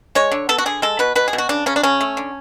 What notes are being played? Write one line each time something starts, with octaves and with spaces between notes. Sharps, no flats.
G#3 C#5
D3
B3 A4
F#4
D3 G#4
G#3 A4
B2 B4
B2 B4
G#4
B2
F#4
C#3 D4
C#3 C#4
D4
C#3 C#4
A3
D3